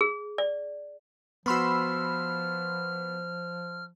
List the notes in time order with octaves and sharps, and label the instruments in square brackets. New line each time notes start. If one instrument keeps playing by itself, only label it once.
[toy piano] G#4
D5
[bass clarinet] F3 [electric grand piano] B3 F#4 [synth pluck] B5 C6 E6 [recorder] F6